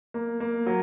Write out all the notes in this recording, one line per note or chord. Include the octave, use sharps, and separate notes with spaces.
A#3
A#3
F#3